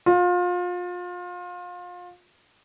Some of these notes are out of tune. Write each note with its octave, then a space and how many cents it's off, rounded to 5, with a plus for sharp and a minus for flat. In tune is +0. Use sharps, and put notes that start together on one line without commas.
F4 +30